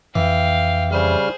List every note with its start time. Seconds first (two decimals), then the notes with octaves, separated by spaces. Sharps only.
0.16 F2 E3 F5 G5
0.92 C#3 G3 G#4 C5 F6